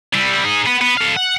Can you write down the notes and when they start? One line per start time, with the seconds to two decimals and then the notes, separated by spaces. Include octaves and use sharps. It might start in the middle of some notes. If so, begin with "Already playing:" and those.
0.14 G3 E4
0.44 D#4 G#4
0.66 B3
0.81 B3
0.97 A4 F5
1.16 F#5